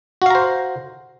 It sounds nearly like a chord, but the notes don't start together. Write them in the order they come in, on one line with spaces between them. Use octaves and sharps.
F#4 F5 A#5 C5